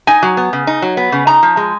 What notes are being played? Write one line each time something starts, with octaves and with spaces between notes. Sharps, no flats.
D#4 G#5
F#3
B3
C#3
D#4
F#3
B3
C#3
D#4 A#5
F3
G#3